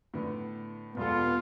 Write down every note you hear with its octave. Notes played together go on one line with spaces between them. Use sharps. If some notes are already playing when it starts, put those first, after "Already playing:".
A2 D3 B3
E1 G3 B3 F4 A4